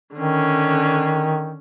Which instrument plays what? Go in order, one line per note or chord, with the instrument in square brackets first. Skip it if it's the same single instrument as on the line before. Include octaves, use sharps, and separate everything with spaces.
[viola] D3 C#4 [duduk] D#3